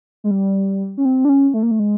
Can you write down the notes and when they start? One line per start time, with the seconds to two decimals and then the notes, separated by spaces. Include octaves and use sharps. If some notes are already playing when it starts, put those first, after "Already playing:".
0.24 G#3
0.31 G3
0.98 C#4
1.05 C4
1.25 D4
1.29 C#4
1.54 A3
1.63 A#3
1.71 A3
1.79 G#3